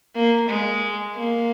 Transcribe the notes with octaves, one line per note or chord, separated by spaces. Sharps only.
A#3
G#3
A#3